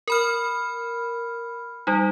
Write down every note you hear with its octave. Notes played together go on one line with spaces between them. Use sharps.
A#4 B5 F6
G3 D#4